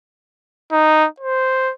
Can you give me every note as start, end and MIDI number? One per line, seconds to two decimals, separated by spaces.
0.72 1.06 63
1.20 1.72 72